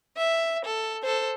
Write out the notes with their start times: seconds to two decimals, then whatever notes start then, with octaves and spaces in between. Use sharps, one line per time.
0.17 E5
0.65 A4
1.03 A4 C5